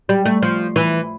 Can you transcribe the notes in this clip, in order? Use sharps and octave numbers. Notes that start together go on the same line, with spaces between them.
G3
A3
F3
E3